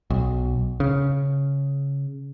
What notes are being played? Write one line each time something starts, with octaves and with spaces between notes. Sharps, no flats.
B1
C#3